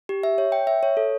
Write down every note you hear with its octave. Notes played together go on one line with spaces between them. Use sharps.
G4
E5
C#5
G5
E5
C#5
A4